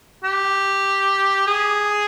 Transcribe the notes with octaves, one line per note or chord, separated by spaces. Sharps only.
G4
G#4